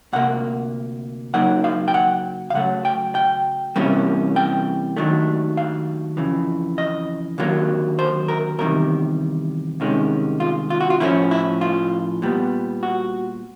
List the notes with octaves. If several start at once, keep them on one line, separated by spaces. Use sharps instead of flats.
D2 C3 A#3 F#5
C#3 F#3 A#3 D#4 F#5
F5
G5
F#5
F5
C#3 F#3 A3 F#5
G5
G5
C3 E3 G3 A#3 C#4
G5
D#2 D#3 F#3 A3 D4
F5
F2 C#3 E3
D#5
D#2 D3 F#3 A#3
C5
A#4
E2 C3 D#3 G3 A#4
C2 C3 D#3 G#3 C#4
F4
F4
F#4
F4
A2 F3 A3 C#4 E4
E4
F4
A#2 G3 B3
F#4